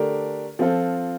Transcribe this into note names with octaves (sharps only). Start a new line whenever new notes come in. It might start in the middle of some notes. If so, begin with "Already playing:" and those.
Already playing: D3 A3 D4 G4 A#4
F3 C4 F4 A4